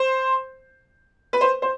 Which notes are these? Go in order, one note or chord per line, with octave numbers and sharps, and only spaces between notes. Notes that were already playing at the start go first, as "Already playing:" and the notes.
Already playing: C5
B4
C5
C5